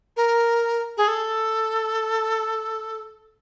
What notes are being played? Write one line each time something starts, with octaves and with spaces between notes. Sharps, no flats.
A#4
G#4
A4